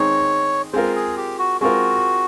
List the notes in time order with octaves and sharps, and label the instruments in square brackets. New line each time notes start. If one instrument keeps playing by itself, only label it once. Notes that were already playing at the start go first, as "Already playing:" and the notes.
Already playing: [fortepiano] D#3 G#3 C4 D#4 [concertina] C#5
[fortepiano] G#3 C4 F4 A#4 [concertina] C5
[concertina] G#4
G4
F#4
[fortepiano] G#3 C4 F4 A#4 [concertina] F#4